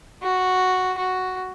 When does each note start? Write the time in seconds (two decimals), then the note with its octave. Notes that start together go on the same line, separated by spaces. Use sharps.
0.23 F#4
0.98 F#4